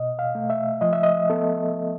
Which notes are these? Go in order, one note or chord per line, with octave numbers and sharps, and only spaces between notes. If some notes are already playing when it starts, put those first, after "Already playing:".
Already playing: B2 D#5
F5
A3
E5
F3 D#5
E5
D#5
B3 A4